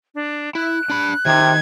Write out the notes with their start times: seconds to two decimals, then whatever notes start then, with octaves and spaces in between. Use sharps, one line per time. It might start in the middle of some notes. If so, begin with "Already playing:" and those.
0.15 D4
0.55 E4 F#6
0.90 D4 B5
1.26 C3 D#3 G#6